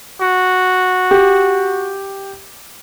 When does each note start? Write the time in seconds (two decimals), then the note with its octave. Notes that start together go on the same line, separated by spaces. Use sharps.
0.21 F#4
1.11 G4